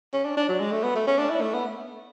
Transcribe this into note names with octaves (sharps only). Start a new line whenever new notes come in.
C#4
D4
D4
F#3
G#3
A3
B3
A3
C#4
D4
E4
A3
B3